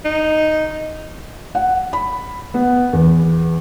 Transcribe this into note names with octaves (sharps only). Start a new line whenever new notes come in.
D#4
F#5
B5
B3
E2